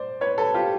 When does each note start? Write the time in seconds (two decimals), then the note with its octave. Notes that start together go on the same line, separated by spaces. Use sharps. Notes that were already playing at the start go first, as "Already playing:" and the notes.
Already playing: C5 D5
0.21 B4 C#5
0.38 A4 B4
0.54 F4 G4